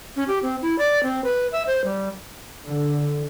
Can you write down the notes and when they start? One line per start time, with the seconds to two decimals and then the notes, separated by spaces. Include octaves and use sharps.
0.16 C#4
0.28 G4
0.42 C4
0.62 E4
0.79 D5
1.03 C4
1.24 B4
1.52 E5
1.67 C5
1.84 G3
2.66 D3